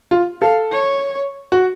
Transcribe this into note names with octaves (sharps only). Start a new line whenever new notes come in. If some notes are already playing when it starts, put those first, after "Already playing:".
F4
A4 F5
C#5
F#4